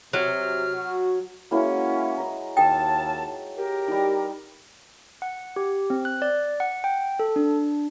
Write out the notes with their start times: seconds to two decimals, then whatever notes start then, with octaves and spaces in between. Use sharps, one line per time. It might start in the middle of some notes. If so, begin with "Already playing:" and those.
0.13 C3 F#3 F6
0.74 F#4
1.51 F#3 G#3 A#3 C#4 E4
2.17 D#5 A#5
2.57 D#2 G5 A5
3.57 G4 A#4
3.88 G3 D#4
5.22 F#5
5.56 G4
5.90 C4
6.05 F#6
6.22 D5
6.60 F#5
6.84 G5
7.19 A4
7.36 D4